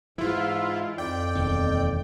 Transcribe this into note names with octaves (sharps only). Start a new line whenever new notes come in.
G#2 E3 E4 F4
F2 D5 G5
E1 D#2